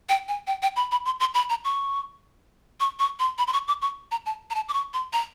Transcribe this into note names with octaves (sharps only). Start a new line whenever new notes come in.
G5
G#5
G5
G5
B5
B5
C6
C6
B5
A#5
C#6
C#6
C#6
C6
B5
C6
C#6
D6
C#6
A#5
A5
A#5
A5
D6
C#6
C6
A#5